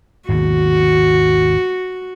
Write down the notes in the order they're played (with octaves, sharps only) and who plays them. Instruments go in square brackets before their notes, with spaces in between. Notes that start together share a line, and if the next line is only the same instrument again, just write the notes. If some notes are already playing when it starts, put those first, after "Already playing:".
[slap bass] G#1 D#2 B2 [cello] F#4